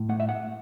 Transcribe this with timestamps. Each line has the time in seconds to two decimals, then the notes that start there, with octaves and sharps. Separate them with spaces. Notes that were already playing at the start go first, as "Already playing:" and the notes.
Already playing: A2
0.09 A3 F#5
0.20 E5
0.29 F#5